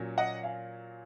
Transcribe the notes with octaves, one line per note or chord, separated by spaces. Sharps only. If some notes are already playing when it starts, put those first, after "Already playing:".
Already playing: A#2 F#3 C#4
D#5 F#5
F5 G#5